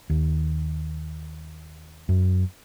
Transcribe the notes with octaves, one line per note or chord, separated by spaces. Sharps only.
D#2
F#2